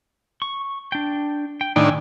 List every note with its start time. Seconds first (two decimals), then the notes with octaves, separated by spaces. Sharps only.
0.42 C#6
0.92 D4 G5
1.61 G5
1.76 A2 D#3 D4 G5 G#5 E6